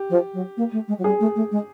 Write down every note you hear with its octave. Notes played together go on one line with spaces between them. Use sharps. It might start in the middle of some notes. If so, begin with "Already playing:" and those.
Already playing: G4
F3
F#3
A#3
A3
G#3
F#3
G3 G#4
A3
A3
G#3